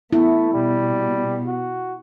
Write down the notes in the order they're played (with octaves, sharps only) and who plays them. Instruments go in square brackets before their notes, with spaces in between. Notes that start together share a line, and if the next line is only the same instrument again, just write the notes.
[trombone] A3 [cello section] B3 [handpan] E4
[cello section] B2 [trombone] G3
[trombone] F#4